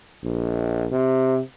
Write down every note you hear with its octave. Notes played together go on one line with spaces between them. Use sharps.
A#1
C3